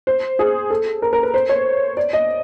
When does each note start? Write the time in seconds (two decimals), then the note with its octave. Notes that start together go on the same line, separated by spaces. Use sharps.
0.07 C5
0.39 G#4
0.70 A4
1.02 A#4
1.13 A#4
1.23 B4
1.34 C5
1.49 C#5
1.97 D5
2.13 D#5